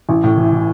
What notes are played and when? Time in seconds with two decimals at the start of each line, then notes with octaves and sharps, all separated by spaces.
0.09 A1
0.24 A2
0.37 E3
0.53 E3